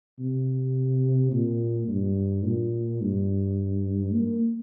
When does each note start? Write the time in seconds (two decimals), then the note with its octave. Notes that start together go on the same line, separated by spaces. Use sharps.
0.20 C3
1.32 A#2
1.88 G2
2.45 A#2
3.02 G2
4.13 A#3